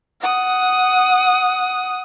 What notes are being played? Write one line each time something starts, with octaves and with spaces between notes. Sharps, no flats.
F#5 D#6